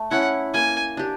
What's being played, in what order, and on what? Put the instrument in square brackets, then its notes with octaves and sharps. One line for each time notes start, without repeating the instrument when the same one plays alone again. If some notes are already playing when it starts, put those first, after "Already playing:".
Already playing: [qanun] A3
[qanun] C#4 E4 [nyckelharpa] F#5
[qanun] A#3 [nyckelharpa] G#5
[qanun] D4 G4